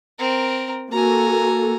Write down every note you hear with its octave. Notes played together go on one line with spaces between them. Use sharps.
C4 A#4
A#3 F#4 A4 G#5 A#5